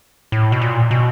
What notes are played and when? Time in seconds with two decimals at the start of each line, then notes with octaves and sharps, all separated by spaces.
0.32 A2
0.52 B2
0.62 A#2
0.91 B2